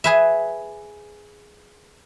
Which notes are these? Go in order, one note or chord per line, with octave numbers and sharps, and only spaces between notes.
G#4 B4 E5